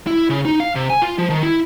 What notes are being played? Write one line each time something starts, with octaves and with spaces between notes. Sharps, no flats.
E4
C#3
D#4
F5
C3
G#5
F4
F3
D#3
E4